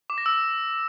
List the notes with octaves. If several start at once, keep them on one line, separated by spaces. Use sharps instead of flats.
D6
A#6
E6